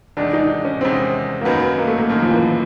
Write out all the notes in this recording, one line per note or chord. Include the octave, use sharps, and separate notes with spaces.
E2 C3 D#3 G#3 D4
D#4
C#4
E2 C3 D#3 G#3 C4
A#3
F#2 D#3 F#3 B3
A#3
A3
A#3
F#2 D#3 F#3 A#3
F3
E3